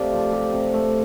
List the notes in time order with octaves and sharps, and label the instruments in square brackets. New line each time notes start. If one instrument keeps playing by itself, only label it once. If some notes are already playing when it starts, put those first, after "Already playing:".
Already playing: [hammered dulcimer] C3 A3 D5 F5 G5
F3
C3
C3
A3